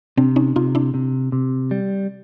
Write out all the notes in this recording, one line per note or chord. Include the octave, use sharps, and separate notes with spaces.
C3 C4 D4
C#4 D#4
C3 D#4 F4
D4 E4
C3
C3
G3